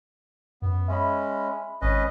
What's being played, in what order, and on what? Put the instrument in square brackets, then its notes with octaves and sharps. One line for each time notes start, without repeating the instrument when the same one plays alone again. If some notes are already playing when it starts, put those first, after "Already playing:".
[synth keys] F#2 [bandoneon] B3
[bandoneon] G#3 C#4 [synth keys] E5 B5
[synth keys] G#1 [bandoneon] C#4 B4 D#5